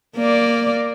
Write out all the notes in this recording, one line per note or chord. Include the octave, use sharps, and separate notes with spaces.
A#3 D5